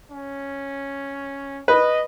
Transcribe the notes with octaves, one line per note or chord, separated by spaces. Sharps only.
C#4
B4 D#5